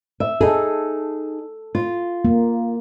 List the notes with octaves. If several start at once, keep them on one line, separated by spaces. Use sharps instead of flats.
E5
D#4 G#4 A4
F4
A#3